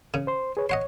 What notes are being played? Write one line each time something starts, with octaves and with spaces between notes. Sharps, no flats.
C#3
C5 C6
G#4 B4 C#5
C#5 D#5 F#5 C6